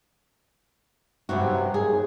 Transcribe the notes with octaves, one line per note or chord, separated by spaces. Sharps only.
G2 C3 F#3 F#4
D#2 G#4